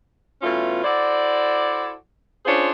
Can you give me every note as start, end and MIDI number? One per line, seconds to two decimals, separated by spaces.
0.42 0.81 47
0.42 0.81 52
0.42 0.81 57
0.42 0.81 61
0.42 0.81 65
0.82 1.92 64
0.82 1.92 66
0.82 1.92 69
0.82 1.92 72
0.82 1.92 74
2.45 2.71 61
2.45 2.71 62
2.45 2.71 65
2.45 2.71 68
2.45 2.71 72
2.45 2.71 73